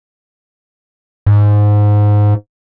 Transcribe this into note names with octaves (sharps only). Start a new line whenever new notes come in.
G#2